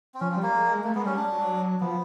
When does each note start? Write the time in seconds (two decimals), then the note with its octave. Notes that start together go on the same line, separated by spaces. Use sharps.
0.14 C4
0.20 F3 C#4
0.32 C4
0.36 G3
0.43 A#3
0.52 G#3
0.84 A3 A#3
0.95 G#3 B3
1.06 G3 C#4
1.16 D4
1.32 F#3
1.80 F3 B3